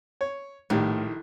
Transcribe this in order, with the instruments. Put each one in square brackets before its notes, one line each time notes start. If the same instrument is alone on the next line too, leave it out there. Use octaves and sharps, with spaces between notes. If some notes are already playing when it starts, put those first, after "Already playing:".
[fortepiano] C#5
[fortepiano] A#1 D#3 G3 [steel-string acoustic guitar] A2